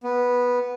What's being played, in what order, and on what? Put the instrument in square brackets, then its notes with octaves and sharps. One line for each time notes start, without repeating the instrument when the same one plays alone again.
[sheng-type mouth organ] B3